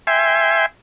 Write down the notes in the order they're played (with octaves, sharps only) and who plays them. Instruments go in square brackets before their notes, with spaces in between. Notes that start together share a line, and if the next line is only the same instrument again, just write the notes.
[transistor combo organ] E5 G5 G#5 C6